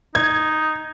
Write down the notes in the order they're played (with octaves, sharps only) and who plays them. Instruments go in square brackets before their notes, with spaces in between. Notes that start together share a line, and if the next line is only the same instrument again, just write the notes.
[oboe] D#4 [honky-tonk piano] G#6